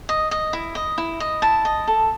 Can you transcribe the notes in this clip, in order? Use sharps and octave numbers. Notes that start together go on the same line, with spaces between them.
D#5
D#5
E4
D#5
E4
D#5
E4 A5
D#5
A4